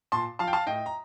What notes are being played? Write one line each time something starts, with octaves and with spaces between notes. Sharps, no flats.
A#2 A5 C6
F3 F5 A5
G5
F5 A5
A2 D#5 G5
A#5